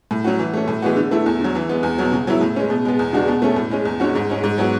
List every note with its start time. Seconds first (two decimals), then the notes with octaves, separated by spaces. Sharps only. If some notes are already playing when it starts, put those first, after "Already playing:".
0.11 A2
0.24 F#3 C#4 F#4
0.39 E3
0.54 A3 C#4
0.68 A2
0.82 E3 G#3 B3 F#4
0.96 D3
1.11 A3 E4
1.26 E2
1.41 D3 F#3
1.55 E3
1.69 G#3 B3
1.83 E2
1.98 B2 F#3
2.12 C#3
2.27 F#3 B3 E4
2.41 A2
2.56 G#3 C#4
2.70 B2
2.85 G#3 B3
2.99 E2
3.13 C#3 G#3 D4 F#4
3.28 B2
3.42 A3 C#4
3.56 A2
3.71 G#3 C#4
3.85 E2
4.00 D3 G#3 C#4 F#4
4.15 G#2
4.30 G#3 C#4
4.44 G#2
4.58 F#3 B3 F#4